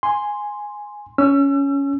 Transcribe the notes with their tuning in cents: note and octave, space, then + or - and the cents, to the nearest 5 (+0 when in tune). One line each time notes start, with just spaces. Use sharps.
G#5 +0 C6 +0
C#4 +10 E6 +40